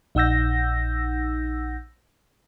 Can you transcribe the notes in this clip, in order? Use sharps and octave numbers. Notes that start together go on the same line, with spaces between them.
A#1 D#4 F#5 E6 G6 A#6